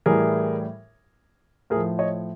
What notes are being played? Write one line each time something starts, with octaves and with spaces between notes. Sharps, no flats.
A2 E3 G3 G#4 A#4
A2 G#4 A#4
F3
C#5 D#5